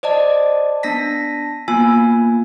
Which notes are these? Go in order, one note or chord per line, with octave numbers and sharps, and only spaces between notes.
C5 D5 D#5 A5
B3 D4 A5 A#6 B6
A#3 B3 F4 G#5